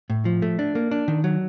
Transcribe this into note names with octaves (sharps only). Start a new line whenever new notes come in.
A2
F3
A3
D4
A#3
D4
D#3
F#3